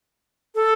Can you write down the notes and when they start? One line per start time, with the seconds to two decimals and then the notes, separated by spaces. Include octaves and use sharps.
0.55 A4